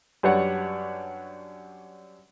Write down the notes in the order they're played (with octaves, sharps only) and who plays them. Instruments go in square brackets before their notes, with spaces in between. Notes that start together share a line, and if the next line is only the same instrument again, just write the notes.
[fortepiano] F#2 G3 D4 B4 C#5 F#5